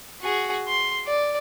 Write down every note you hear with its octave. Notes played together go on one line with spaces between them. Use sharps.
F#4 G#4
C6
D5